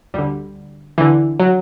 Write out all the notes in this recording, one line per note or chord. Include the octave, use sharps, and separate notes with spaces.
D2 D3 G3
D2 D3 E3
F#3